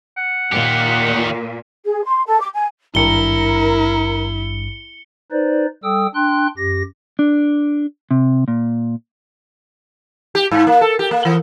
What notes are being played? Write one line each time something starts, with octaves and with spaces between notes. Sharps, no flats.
F#5
A#2 D#3 G4
G#4
C6
A4
D6
G#5
G#1 G2 E4 A#4 A#5 C#7 G7
D#4 B4 C5 D5
G3 A4 G5 D#6 E6
D4 G5 C6 F#6
F#2 G4 A#6
D4
C3
A#2
G4
G#2
A#3
A4
G4
A#3
E3